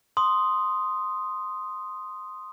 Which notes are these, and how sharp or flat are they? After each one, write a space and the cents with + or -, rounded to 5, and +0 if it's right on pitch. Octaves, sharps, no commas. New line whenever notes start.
C6 +0 D#6 +0